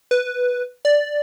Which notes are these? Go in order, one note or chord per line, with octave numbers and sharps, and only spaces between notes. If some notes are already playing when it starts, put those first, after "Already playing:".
B4
D5